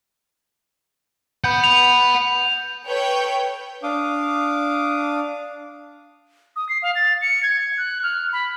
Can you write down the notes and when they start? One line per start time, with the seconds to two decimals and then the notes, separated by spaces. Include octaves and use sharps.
1.44 F#5 B5 G6
1.64 F7
2.85 A4 B4 C#5 G5 G6
3.83 D4 F5 D6 D#6
6.56 D#6
6.69 C7
6.83 F5
6.95 A6
7.21 C#7
7.43 G#6
7.78 F#6
8.03 F6
8.33 B5